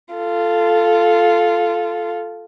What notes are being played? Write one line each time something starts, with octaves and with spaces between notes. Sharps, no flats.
F4 A4